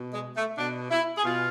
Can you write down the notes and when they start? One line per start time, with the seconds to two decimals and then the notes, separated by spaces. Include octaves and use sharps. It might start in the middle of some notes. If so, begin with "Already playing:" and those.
Already playing: B2
0.13 G#3
0.36 A3
0.58 B2 D4
0.91 E4
1.17 G#4
1.24 B2 F4